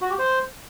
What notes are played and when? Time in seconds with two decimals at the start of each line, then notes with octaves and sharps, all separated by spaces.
0.01 F#4
0.10 G4
0.19 C5